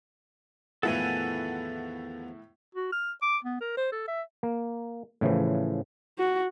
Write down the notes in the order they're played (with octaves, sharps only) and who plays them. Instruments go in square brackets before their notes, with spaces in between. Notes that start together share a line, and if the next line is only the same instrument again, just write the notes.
[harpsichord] E2 D#3 F3 [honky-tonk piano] A2 E4 F#5 [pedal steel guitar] A4 G#5
[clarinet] F#4
F6
D6
B3
A#4
C5
A4
E5
[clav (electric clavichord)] A#3
A2 C#3 E3 F3
[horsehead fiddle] F#4